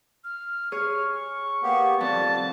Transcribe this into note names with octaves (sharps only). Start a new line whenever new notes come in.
F6
G#4 C#5 F6
C#6
A#3 B3 G4
F2 G3 A5